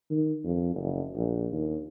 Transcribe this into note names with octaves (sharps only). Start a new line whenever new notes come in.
D#3
F2
F#1
A#1
D#2